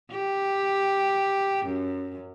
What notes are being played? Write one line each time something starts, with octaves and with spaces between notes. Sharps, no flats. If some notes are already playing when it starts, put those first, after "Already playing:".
G4
F#2